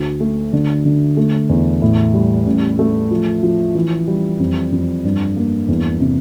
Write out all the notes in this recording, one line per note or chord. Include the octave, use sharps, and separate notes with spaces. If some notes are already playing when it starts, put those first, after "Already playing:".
Already playing: D2
A3
D3
D3
A3
E2
A2
G3
A1
A3
F3
F3
E3
G3
F2
F2
G2
A#3
E2
C3